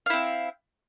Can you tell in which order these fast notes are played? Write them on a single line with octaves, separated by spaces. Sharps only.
F5 E4 C4